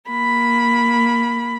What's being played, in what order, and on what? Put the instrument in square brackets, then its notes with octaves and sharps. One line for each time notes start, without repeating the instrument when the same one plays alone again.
[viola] A#3 B5